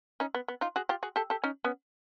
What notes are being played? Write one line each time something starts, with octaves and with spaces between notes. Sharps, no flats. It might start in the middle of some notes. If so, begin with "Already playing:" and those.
C#4 D#4
B3
B3
D#4 F4
F#4 G#4
F4 G4
F#4 G#4
G4 A4
G4 A4
C#4 D#4
B3 C#4